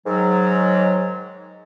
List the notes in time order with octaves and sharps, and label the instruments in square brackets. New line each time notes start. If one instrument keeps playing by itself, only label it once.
[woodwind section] G#2 D#3 F#3